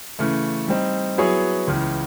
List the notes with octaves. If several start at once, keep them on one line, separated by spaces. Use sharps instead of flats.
C#3 E3 A3
G3 C4 D#4
F#3 B3 E4 G#4 C#5
C#2 C#3 E3